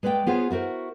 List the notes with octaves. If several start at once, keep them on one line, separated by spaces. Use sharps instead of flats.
G#3 B4 D5 E5 G5
B3 F4 G#4 C5 C#5
E4 F#4 A#4 C5